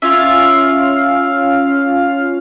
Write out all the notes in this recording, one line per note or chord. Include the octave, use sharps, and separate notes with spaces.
C#4 F4 E5 F5